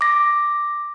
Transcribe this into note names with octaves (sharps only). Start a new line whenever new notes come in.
D6 A#6